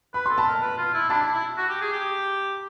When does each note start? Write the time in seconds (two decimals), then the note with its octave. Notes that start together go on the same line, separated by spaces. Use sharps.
0.14 B4 B5
0.26 A4 C6
0.38 A5 B5
0.47 A#4
0.62 B4
0.78 F4
0.94 E4
1.10 D4 A5 B5
1.22 E4
1.33 E4
1.57 F#4
1.69 G4
1.81 G#4
1.93 G4